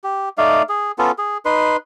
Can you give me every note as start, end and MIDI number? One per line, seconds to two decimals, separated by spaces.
0.04 0.29 67
0.38 0.63 57
0.38 0.63 63
0.38 0.63 74
0.38 0.63 77
0.69 0.92 68
0.98 1.11 59
0.98 1.11 61
0.98 1.11 65
0.98 1.11 69
1.18 1.38 68
1.45 1.77 63
1.45 1.77 71
1.45 1.77 84